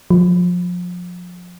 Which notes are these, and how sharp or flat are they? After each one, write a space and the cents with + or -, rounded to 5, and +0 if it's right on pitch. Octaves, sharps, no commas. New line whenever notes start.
F3 +30